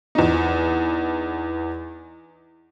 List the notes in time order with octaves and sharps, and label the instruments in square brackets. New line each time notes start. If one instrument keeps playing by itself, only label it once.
[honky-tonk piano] E2 D#4